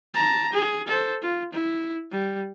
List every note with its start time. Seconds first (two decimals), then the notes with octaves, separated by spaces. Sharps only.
0.14 A5 A#5
0.53 G#4
0.88 A4 C5
1.22 F4
1.53 E4
2.11 G3